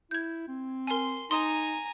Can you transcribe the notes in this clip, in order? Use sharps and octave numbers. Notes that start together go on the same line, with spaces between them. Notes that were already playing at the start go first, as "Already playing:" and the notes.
E4 G6 G#6
C4
A#4 G#5 C6
D#4 G#5 A#5 C6 D#6